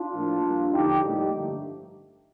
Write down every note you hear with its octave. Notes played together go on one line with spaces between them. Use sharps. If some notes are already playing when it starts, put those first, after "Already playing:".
Already playing: D4 F4
A2 F3 A#3
G2 F3 A#3
F2 D3 F3 D#4 G4
A2 G3 A#3 D#4 G4
G2 D3 F3 A3